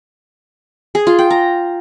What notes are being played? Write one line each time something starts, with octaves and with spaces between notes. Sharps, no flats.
G#4
F4
G5
A#5